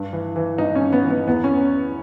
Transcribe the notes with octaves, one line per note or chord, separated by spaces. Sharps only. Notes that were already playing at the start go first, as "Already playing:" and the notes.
Already playing: G2
E3
E3
G2 D#4
C#4
G2
B3
E3
B3
E2 B3
C#4